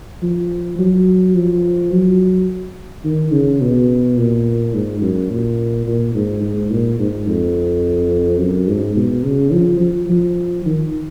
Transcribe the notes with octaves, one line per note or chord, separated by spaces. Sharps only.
F3
F#3
F3
F#3
D#3
C#3
B2
A#2
G#2
F#2
A#2
A#2
G#2
G#2
A#2
G#2
F2
F#2
G#2
B2
C#3
F3
F3
F3
D#3